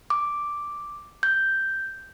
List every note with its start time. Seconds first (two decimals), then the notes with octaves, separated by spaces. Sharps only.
0.10 D6
1.23 G6